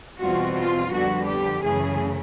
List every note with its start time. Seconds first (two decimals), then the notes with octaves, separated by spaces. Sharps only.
0.21 E2 B2 G3 C4 F4 F#4
0.57 F4
0.92 F2 D3 G3 B3 F#4
1.26 G4
1.62 F#2 C#3 E3 A3 G#4